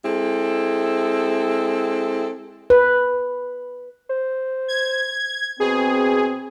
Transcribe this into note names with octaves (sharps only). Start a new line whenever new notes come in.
G#3 C4 E4 A4
B4
C5
G#6
B2 C4 G#4